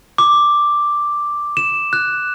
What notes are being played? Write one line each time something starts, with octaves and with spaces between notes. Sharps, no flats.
D6
E7
F#6